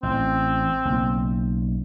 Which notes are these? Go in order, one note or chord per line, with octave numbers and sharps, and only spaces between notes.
A1 C4
B1 C#3 A#3